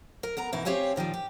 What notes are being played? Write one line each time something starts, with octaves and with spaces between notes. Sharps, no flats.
A#4
B3 A#4 A#5
B2 E3 D#4 E5
C4 G4 C#5 E5 F5 G#5
A#2 D#3 F3 G3
G4